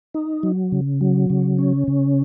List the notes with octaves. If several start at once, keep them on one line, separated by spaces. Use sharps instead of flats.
D#4
F#3
C#3
F#3
C#3
C#4
C#3